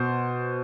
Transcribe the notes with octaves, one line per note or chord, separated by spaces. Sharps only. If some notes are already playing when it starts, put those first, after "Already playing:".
Already playing: B2 C5